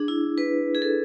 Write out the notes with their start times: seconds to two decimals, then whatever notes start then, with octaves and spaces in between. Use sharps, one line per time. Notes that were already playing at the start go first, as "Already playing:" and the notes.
Already playing: D4 G#4
0.08 E4
0.38 B4
0.75 G#4
0.82 A4